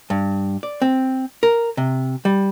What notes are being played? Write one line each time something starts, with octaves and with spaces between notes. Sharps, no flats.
G2
D5
C4
A#4
C3
G3